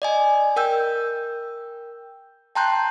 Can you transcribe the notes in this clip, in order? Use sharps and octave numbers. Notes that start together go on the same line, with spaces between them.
D5 D#5 G#5
A#4 G5 E6 G6
G5 A5 A#5 C6 F#6 G6